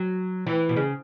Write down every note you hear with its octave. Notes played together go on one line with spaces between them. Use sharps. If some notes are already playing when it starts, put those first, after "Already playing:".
Already playing: F#3
E3
B2
C#3